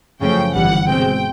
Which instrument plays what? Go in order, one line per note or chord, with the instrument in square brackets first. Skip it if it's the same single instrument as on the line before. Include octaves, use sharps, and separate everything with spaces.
[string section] F#2 C#3 F3 A3 C#4 G5
G1 G2 E3 G3 F#5
B2 G#3 C4 G5